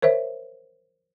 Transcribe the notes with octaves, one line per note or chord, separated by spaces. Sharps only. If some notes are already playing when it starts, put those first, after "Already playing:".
A#4 C5 C#5 E5